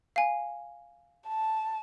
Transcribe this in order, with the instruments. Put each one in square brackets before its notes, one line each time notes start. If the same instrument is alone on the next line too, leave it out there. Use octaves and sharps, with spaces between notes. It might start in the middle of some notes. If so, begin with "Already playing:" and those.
[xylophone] F5 G#5
[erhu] A5